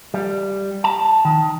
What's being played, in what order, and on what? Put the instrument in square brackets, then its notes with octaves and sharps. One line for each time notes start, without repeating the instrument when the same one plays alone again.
[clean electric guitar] G3
A5
D#3